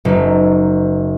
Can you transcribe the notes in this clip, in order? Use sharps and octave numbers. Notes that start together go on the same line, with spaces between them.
F#1 D#4